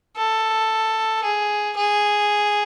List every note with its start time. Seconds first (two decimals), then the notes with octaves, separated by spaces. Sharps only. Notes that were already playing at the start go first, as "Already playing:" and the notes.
0.17 A4
1.24 G#4
1.76 G#4